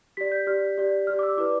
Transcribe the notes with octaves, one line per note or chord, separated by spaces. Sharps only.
G4 D5 B6
G6
G4 D5 F6
G4 D5
G4 D5 F6
D6
E6
E4 B4 D5 D6